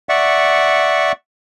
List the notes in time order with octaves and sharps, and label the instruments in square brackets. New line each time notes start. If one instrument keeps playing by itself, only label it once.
[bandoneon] D5 E5 F#5 C#6